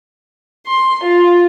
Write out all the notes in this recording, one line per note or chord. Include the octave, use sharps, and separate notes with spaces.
C6
F4